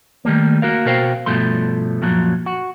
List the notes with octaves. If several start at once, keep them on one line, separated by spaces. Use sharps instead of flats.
D#3 G3 A3 A#3
A#3 F#4 A#4 F5
B2 F#4 A#4 C5 F5 G5
G2 B2 F3 A3 C6
F#2 A#2 F3 F#3
F#4